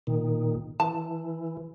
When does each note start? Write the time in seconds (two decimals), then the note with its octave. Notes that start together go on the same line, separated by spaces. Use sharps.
0.07 A#2 D#3
0.80 E3 A5